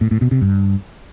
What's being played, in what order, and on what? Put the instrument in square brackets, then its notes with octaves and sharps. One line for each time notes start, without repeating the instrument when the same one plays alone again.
[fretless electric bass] A2
A2
B2
C3
G2